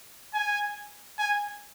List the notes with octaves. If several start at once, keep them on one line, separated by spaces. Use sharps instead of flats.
G#5
G#5